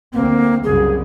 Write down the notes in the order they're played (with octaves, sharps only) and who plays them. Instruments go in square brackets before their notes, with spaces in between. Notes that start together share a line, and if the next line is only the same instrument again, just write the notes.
[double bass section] D2 C4 [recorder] A#3
[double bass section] C2 F#2 C#3 [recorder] G#4